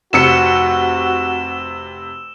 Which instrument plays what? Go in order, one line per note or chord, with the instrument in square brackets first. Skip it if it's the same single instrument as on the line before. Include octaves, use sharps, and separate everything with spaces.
[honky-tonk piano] F1 C3 C#7 [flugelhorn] F#4 [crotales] E6 E7